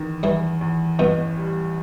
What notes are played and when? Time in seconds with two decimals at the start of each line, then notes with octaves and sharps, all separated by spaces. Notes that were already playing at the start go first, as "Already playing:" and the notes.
Already playing: E2 D#3
0.23 E2 E3 G3
0.61 E2
0.99 A1 G2 B2
1.37 G3